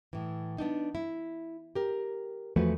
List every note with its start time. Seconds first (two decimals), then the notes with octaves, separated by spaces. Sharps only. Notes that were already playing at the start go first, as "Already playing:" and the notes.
0.13 A2 E3
0.58 B3 D4 D#4
0.95 E4
1.75 G4 A#4
2.56 E2 F3 A3 F#4 G#4 B4